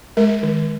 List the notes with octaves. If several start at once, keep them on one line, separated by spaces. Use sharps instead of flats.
G#3 A#4
D#3